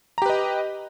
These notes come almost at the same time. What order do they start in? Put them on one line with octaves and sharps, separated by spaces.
A#5 G4 B4 D#5